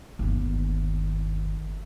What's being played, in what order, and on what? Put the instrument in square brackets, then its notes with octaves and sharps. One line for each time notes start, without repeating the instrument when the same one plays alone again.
[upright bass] G1 D#2